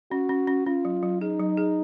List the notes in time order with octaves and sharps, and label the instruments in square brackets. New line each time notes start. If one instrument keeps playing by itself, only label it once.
[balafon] C#4 [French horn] F#4
[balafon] C#4
C#4
[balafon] C#4 [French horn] F4
[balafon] F#3
F#3
[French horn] D#4 [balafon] G#4
[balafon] F#3
G#4